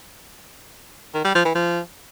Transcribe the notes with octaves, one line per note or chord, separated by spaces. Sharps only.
D#3
G3
F3
E3
F3